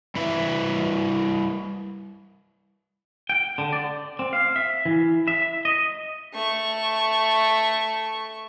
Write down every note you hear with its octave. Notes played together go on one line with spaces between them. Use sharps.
G3 E4 B4 E5
G5
D3
D5
C4
F5
E5
E3
E5
D#5
A3 C#6